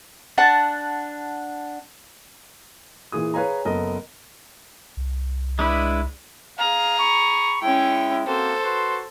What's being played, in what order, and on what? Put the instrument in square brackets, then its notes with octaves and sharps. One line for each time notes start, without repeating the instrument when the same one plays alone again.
[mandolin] D4 F#5 A5
[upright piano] A#2 E3 G#4 D#6
G#4 B4 C#5 F5 G#5 A#5
F#1 B3 A4 A#4 D#5
[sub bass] C2
[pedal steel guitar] G#3 D4 B4 [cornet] E4
[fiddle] G#4 A#5 [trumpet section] F5
[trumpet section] B5 C#6
[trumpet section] G#3 E4 [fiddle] C#4 G5
[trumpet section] A#3 C4 F#4 [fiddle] A4 C5
[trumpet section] F#4 B4 C6